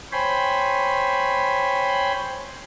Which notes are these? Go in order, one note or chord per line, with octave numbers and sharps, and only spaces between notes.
C5 C#5 G5 G#5 B5 C6